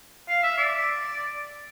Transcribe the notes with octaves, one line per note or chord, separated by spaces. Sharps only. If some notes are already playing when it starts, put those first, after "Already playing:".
F5
E5
D5